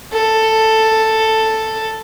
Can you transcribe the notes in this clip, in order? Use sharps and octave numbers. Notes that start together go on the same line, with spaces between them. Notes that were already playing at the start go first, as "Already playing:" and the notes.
A4